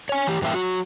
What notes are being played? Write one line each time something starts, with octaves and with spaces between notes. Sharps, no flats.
C#5 G#5
E3 G4
G2 E3 A#3 C#4 E5 G5
F#3 F#4